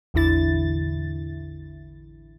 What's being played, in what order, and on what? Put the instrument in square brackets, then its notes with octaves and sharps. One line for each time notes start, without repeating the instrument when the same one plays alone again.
[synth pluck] A1 E2 D3 E4 A6